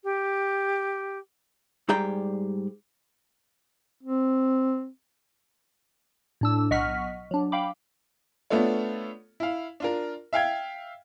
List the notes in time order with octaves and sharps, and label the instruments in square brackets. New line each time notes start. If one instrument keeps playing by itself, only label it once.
[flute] G4
[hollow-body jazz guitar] G#2 G3 G#4 D5 G5 A#5
[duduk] C4
[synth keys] A2 D4 E6
B1 D#5 F#5 C#6 F6 B6
F#3 D4
F5 G5 B5 D6
[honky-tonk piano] A3 B3 D4 F4 A4 C#5
E4 F5
D4 F4 A#4
E5 F5 G5 G#6